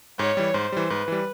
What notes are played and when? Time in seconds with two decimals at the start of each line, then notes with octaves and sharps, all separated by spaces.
0.18 G#2 C#5
0.37 E3 G3
0.54 G#2 C5
0.72 E3 G3
0.90 G#2 B4
1.08 E3 G3